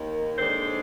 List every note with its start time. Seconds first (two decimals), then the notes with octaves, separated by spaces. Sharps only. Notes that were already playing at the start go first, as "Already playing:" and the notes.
Already playing: D#2 D#3 A#3
0.38 D#2 D3 G#3 D4 C5